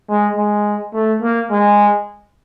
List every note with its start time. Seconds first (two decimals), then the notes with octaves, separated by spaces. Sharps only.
0.09 G#3
0.36 G#3
0.94 A3
1.22 A#3
1.51 G#3